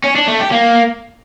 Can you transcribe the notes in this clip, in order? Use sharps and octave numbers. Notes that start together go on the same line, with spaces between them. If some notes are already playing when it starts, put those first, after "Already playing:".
C#4
D4
A3
G4
A#3